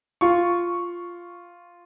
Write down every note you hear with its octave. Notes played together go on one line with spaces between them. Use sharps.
F4 C#6